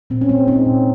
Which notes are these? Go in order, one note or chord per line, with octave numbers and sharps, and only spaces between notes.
A#2 C4
C#4
G#3 C4
G#3 C4 D#4
A#2